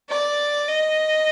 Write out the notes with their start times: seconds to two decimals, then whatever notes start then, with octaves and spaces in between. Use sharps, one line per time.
0.09 D5
0.68 D#5